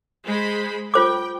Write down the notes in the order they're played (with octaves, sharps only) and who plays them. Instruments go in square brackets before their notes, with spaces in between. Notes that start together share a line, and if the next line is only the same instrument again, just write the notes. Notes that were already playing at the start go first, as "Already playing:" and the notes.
[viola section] G#3 C5 B5
[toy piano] F4 C5 D6 [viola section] G5